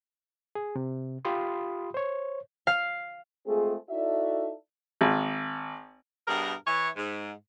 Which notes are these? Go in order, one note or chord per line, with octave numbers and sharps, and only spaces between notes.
G#4
C3
F4 G4 B5 C6 D#6
C5 C#5
F5
G#3 A3 C4 F4 G#4
D#4 E4 F#4 A4 D5 E5
G#1
G2 B2 G3 G#4 A#4
E3 C#5
G#2